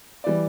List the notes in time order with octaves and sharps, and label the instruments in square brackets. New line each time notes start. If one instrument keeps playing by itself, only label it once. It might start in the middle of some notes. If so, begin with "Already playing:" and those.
[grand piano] E3 G3 D5